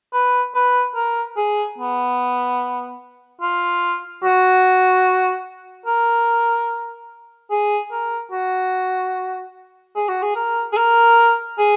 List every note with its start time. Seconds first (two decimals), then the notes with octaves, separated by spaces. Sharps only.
0.14 B4
0.55 B4
0.95 A#4
1.37 G#4
1.78 B3
3.41 F4
4.24 F#4
5.86 A#4
7.51 G#4
7.92 A#4
8.32 F#4
9.96 G#4
10.08 F#4
10.23 G#4
10.36 A#4
10.73 G#4
10.77 A#4
11.59 G#4